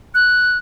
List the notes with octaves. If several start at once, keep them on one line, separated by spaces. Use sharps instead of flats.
F#6